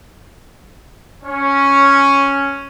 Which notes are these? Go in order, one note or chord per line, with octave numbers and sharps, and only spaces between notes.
C#4